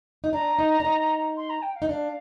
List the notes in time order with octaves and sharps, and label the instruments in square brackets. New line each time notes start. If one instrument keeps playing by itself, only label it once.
[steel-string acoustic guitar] D#4
[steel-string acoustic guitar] D4 [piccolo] A#5
[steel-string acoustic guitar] D#4
D4
D#4
[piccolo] C6
A#5
G5
F5
[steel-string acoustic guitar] D#4
[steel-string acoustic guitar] D4 [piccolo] F5